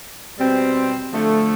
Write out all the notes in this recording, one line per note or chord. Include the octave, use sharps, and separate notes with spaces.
B2 G3 C4
D3 F3 A3